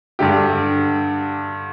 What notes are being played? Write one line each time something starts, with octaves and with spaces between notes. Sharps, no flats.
G2 D3 G4